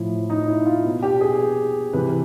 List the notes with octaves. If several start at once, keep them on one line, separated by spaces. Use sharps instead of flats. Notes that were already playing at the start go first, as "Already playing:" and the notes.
Already playing: A2 F3 E4
D#4
E4
F4
B2
G4
G#4
C3 E3 B4